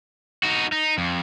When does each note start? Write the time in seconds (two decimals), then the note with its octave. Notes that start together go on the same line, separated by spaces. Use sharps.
0.43 D#4 F#4
0.72 D#4
0.98 F2